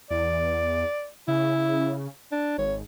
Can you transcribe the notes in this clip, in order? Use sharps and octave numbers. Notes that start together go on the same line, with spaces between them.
E2 D5
C#3 E4
D4
G#1 C#5